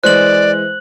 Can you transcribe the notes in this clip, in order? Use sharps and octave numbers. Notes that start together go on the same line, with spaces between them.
E3 G#3 C5 D5 F#6 F#7